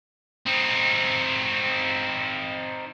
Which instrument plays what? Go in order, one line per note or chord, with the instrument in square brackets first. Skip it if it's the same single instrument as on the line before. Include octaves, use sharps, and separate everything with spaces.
[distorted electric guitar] C4 D#4